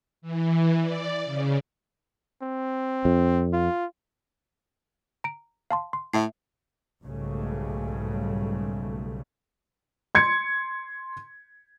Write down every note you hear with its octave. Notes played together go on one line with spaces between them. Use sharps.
E3
D5
C#3
C4
F2
F4
A#5 D7
F5 A5 C6
C6
A2 E5 C7
B1 G#2 C#3 G3 A3
C6 G#6 C#7